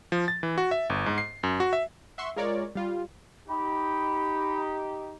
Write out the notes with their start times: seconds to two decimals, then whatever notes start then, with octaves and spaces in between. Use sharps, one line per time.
0.12 F3
0.28 A6
0.43 E3
0.58 F#4
0.71 E5
0.90 G1
1.06 G#2
1.18 C7
1.43 F#2
1.60 F#4
1.73 E5
2.18 E5 F#5 C6 C#6
2.36 G#3 F4 A#4 C#5 D5
2.75 G3 F4
3.49 D#4 G4 B5